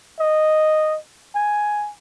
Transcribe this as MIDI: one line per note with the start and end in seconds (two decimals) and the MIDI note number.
0.20 0.98 75
1.35 1.91 80